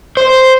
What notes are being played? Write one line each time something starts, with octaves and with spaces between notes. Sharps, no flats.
C5